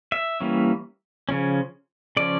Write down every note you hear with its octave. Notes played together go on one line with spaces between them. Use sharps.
E5
E3 G3 A#3 C#4
C#3 F3 C#4
C#3 F3 C#4 D5